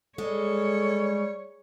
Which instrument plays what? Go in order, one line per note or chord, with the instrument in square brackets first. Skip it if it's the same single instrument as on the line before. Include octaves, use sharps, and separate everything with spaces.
[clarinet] G3 [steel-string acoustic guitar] G#3 [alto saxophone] A4 [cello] C#5